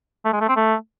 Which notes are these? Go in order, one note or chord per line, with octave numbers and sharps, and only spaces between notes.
A3
G#3
A3
C4
A3